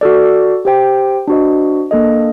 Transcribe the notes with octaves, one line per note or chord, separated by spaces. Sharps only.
F#4 A4 D5
G4 C5 G5
D4 F#4 C5 D#5
A#3 D4 A4 D#5